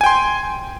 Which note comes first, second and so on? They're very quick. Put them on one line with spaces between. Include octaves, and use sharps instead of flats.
G#5 G5 C6